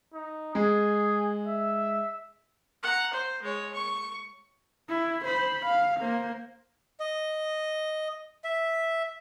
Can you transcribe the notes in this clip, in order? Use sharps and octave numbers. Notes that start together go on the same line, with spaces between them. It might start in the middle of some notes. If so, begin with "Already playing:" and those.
D#4
G#3 G#4
E5
F#5 A#5
C5
G#3 C#5
C#6
E4
C5 B5
F5
A#3 C5
D#5
E5